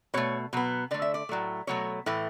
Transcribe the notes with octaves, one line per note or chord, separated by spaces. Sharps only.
B2 A3 C#5
B2 F#3 B3
D3 A3 D5
E5
D5
A2 F#3 A3
B2 F#3 A3 C#5
A2 E3 A3